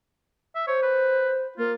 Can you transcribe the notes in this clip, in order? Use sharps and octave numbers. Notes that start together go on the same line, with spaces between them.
E5
C5 C#5
B4
A#3 F4